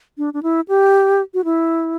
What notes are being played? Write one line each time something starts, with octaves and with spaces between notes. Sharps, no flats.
D4
D4
E4
G4
F#4
E4